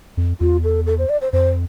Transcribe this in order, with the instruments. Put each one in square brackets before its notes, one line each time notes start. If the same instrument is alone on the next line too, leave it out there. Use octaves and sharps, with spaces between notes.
[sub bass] F2
[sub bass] E2 [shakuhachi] F4
[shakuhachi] A4
A4
C5
D5
C5
[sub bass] F2 [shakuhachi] C5